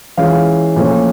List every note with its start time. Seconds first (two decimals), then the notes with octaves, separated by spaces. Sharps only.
0.17 E3 G#3 C#4 F4 F5
0.76 A#2 F3 A3 C#4